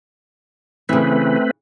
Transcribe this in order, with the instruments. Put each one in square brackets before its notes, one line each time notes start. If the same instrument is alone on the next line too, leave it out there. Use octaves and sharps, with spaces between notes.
[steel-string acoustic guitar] C#3 E3 [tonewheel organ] A3 C4 B4